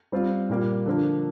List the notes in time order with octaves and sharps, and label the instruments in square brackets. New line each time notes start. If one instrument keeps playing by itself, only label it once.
[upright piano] G3 C4 F4
A#2 G3 A#3 F4
D3 F3 A#3